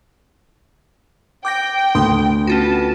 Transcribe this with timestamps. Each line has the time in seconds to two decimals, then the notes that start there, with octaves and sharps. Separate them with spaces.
1.45 G5 D6 G6 A#6
1.95 D2 C6 D#6
2.47 B3 C#4 F4 F#4 A5